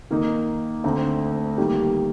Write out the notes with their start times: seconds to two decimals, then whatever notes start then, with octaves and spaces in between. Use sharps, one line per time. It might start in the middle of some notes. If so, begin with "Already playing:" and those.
0.11 D#3 A#3 D#4
0.84 D2 D3 A3 C4
1.58 D#3 G3 A#3